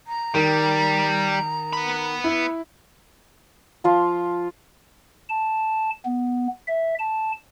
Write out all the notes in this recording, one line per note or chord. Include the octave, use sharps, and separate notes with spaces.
A#5
D#3 G3
B3 B5
E4
F3 F4 F5
A5
B3
E5
A5